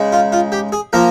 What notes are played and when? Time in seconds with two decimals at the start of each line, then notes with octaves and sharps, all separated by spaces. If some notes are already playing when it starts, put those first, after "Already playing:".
Already playing: C#3 G#3 D#4
0.12 F4
0.32 F4
0.52 G4
0.72 G#4
0.93 F3 A#3 F4 A#4